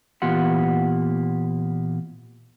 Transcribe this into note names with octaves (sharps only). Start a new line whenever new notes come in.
A#2 E3 B3 F4 G4 F#5